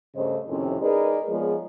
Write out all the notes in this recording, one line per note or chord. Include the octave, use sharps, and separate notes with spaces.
G2 C#3 A3 C5 D#5
F2 A2 C3 D#3 C#4
D#4 G#4 A#4 B4 D5
F3 G#3 B3 G#4 C#5